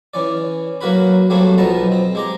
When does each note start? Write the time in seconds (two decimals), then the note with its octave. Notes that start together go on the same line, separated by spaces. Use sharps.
0.14 E3 C#4 D5
0.81 F#3 A#3 F#4 A#4 B4 B5
1.30 F#3 G3 A3 A#3 C4 F#4
1.58 B1 F3 B3 D#4 A5 A#5
1.92 C4
2.15 G#3 G4 A#5